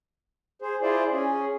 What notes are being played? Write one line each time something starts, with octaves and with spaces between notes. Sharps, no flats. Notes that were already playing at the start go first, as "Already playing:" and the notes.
G#4 C5
E4 F4 G#4 C5 D5
C#4 G#4